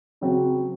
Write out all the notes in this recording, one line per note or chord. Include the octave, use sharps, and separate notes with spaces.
C#3 F#3 C4 F#4